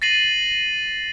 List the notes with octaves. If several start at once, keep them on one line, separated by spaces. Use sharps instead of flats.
A6 A#6 C7 D#7 F#7